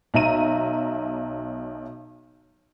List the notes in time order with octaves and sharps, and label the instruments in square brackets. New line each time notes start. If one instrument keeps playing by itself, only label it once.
[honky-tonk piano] B1 E5 A#5 D#7